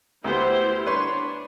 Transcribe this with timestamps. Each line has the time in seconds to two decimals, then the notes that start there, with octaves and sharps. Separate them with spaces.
0.24 D2 B3 E4 G4 C5
0.86 D4 B4 C#5 C6